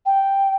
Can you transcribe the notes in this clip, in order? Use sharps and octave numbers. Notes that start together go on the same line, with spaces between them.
G5